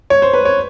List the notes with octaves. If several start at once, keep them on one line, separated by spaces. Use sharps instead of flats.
C#5
C5
B4
C#5